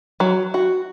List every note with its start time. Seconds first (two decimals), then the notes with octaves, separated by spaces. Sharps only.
0.20 F#3
0.54 F#4